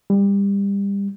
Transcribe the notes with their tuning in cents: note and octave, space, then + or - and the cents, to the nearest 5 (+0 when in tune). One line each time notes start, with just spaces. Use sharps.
G3 +25